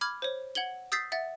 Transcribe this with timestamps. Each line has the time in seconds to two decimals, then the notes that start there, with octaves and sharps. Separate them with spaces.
0.01 B5 D6 F6 G#6
0.22 C5 C#5
0.55 F#5 G#6 F#7 G7
0.92 D#6 E6 G6 A6 B6 C7
1.12 E5 F#5 A6